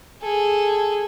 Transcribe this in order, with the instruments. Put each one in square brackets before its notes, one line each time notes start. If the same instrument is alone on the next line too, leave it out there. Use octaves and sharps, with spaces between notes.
[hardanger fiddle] G#4 A4